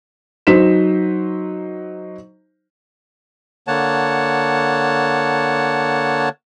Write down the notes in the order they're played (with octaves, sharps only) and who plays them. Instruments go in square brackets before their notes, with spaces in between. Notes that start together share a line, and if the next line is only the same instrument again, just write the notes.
[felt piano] F#3 D#4 C5 B6 E7
[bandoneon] D3 A#3 C#5 F#5 A5